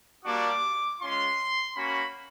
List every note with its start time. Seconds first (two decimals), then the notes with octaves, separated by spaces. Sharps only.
0.25 G3 A#3 D4 F#4 D6
1.00 G#3 C#4 F4 C6
1.76 A#3 C#4 F#4 B5